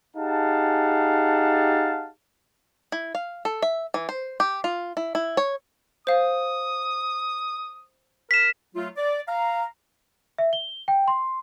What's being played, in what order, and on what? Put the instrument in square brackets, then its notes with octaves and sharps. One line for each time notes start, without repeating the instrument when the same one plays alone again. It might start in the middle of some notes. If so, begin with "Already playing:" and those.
[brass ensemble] D#4 G4 G#4 F5 F#5 A5
[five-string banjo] E4
F5
A4
E5
E3
C5
G4
F4
E4
E4
C#5
[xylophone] C5 F5 [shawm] D#6
[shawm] A#4 [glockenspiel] B6 E7
[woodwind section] F#3 A3 F4
D5
F5 A#5
[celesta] E5
G7
G5
C6